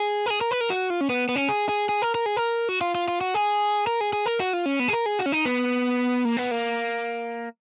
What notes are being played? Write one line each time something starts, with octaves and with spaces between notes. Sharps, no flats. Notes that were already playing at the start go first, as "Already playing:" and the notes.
Already playing: G#4
A#4
G#4
A#4
B4
A#4
F#4
F4
C#4
B3
B3
C#4
G#4
G#4
G#4
A#4
A#4
G#4
A#4
F#4
F4
F4
F4
F#4
G#4
A#4
G#4
G#4
A#4
F#4
F4
C#4
B3
G#4
A#4
G#4
F#4
C#4
D#4
B3
A#3
B3
A#3